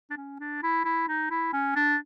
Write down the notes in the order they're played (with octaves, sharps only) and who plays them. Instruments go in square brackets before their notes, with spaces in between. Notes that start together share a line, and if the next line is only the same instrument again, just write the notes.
[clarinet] D4
C#4
D4
E4
E4
D#4
E4
C#4
D4